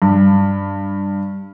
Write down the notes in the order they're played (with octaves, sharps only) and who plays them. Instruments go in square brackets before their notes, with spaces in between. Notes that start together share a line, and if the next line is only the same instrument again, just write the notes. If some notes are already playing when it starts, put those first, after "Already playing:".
[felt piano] G2